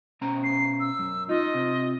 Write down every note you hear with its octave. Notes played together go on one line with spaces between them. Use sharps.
B2 C#4 A#5
C7
E6
F#2
D#4 F4 D#5
C3